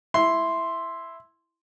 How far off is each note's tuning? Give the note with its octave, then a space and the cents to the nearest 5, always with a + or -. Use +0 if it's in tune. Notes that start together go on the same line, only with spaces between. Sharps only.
E4 +0 C6 +0